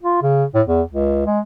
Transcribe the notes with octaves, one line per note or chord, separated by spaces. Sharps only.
F4
C#3
A2
E2
C#2
G#3